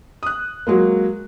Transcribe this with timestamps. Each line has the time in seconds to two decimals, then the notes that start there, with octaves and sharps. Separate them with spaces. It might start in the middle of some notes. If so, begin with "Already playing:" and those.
0.23 D#6 F#6
0.67 F#3 G#3 A#3